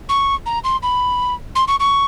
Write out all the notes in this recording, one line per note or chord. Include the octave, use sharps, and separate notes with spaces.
C#6
A#5
C6
B5
C6
C#6
C#6